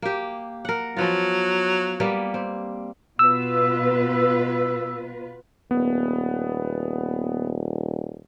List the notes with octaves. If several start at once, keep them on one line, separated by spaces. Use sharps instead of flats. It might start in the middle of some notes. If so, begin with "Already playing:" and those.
A#3 G4
A#4 F#5
F3 F#3 B3 F4
G3 A#3 B3
C4
B2 F4 B4 E6
D#1 B3